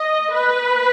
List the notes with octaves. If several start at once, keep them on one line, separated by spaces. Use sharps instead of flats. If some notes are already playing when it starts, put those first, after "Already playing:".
Already playing: D#5
B4